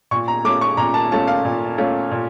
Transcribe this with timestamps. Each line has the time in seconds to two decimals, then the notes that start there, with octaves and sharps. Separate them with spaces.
0.11 A#2 C#6
0.28 A#5
0.44 A3 C#4 F4 D6
0.61 C#6
0.77 A#2 A#5
0.94 A5
1.12 A3 C#4 F4 A5
1.27 F5
1.45 A#2
1.78 A3 C#4 F4
2.11 A#2